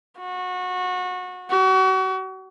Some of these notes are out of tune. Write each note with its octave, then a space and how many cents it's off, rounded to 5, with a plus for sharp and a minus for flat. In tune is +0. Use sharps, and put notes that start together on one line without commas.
F#4 -25
F#4 +35